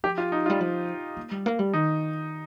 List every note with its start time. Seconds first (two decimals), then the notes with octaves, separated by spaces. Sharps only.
0.04 F3 G4
0.18 F4
0.32 D#4
0.46 G3 F4
0.61 F3
1.17 A#3
1.31 G3
1.46 A#3
1.59 G3
1.73 D#3 D#4